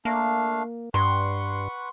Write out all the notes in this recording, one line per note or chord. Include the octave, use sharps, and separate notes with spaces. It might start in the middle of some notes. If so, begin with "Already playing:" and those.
A3 A#3 D4 F5
G2 B4 F#5 C6 C#6